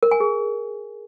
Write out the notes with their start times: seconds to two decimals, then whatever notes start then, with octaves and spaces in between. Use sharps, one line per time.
0.03 A#4
0.11 G#5
0.20 G#4